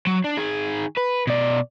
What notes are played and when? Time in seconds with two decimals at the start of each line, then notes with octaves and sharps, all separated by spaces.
0.07 F#3
0.24 D4
0.37 D#3 G#4
0.97 B4
1.27 B2 D5